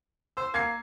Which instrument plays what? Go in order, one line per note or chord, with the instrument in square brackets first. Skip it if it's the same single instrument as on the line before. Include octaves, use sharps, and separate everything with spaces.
[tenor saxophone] C5 [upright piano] E6
[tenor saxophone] A#3 [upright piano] G#6 C7